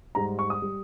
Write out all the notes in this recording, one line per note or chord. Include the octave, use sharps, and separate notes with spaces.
G#2 G3 A#5
C#6
D#6
G3